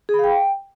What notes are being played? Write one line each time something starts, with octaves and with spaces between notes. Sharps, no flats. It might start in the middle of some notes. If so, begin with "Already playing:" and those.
G#4
B5
F5
G5